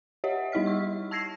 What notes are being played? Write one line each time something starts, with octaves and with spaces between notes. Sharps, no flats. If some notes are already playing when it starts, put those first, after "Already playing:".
G4 C#5 D#5 E5 F#5
G3 D#4 E4 D#5 F6 B6
C#6 E6
A5 E6 G#6 A#6 C7